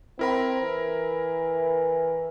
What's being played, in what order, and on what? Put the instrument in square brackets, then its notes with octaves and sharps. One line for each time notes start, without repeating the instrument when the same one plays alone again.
[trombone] C4 [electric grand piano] E4 A#4 B5
[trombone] E3